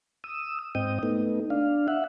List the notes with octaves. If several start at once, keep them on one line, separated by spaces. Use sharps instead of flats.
D#6 E6
G#2 C4 D#5 G5 D#6
A3 B3 D#4
D4 F5
E5 F#5